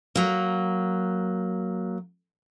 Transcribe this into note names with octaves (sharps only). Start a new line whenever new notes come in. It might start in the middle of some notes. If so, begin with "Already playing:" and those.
F#3 A#3